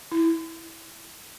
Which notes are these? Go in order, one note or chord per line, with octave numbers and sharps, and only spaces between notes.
E4